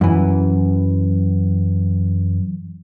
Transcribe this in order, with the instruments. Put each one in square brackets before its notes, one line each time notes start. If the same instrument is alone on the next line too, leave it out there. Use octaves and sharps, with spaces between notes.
[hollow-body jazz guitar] F#2 E3